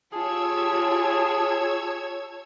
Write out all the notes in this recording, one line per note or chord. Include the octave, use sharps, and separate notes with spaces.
F4 G4 G#4 C#5 A5 E6 G#6